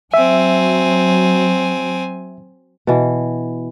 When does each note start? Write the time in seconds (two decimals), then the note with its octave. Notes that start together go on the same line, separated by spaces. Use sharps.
0.14 F#3 C4 E5 G#5
2.87 B2 E3